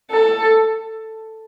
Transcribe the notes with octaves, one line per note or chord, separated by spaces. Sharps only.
A4